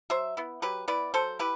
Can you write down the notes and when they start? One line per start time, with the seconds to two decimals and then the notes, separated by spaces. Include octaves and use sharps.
0.10 F#3 C5 E5
0.37 B3 E4
0.62 F#3 G4 B4
0.88 B3 E4 B4 D5
1.14 F#3 A4 C5
1.39 E4 G4 B4